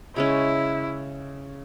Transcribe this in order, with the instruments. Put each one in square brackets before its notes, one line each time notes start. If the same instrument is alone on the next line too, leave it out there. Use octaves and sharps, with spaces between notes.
[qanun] C#3 G#3 C#4 [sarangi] E4